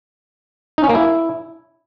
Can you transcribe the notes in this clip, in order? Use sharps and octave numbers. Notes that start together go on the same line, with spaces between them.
D#4
C#4
A#3
E4